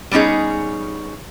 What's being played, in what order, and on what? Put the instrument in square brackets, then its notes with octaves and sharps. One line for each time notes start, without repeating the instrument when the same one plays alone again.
[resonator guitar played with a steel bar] G3 B3 C#4 D#4 G#4